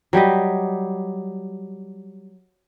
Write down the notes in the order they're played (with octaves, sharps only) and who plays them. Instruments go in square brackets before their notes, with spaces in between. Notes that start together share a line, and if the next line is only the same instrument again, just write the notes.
[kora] F#3 G3 G4 D#5